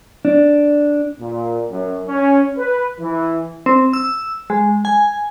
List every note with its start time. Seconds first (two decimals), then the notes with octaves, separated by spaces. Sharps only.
0.25 D4
1.20 A#2
1.70 F#2
2.08 C#4
2.58 B4
2.99 E3
3.66 C4
3.93 E6
4.50 G#3
4.85 G#5